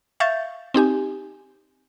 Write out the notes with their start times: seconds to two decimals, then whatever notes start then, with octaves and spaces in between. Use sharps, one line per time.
0.20 E5 F5 C#6 G6 A6
0.74 C4 D#4 G4 G#5